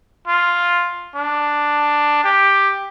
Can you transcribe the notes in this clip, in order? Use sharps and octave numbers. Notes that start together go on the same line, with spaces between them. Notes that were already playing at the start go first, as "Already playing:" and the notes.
F4
D4
G4